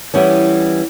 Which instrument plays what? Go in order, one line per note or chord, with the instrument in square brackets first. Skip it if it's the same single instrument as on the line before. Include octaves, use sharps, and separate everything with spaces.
[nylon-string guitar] E3 G3 B3 C#4